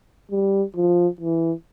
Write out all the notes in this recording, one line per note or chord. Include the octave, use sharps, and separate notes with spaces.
G3
F3
E3